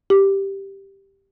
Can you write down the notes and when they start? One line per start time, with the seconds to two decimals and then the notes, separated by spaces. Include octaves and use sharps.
0.10 G4